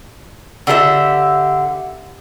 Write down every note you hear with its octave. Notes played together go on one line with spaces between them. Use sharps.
D3 G4 G#4 E5